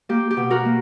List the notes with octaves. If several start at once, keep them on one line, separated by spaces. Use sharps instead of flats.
A#3 G4
G4
B2
F#4 A#4
A#3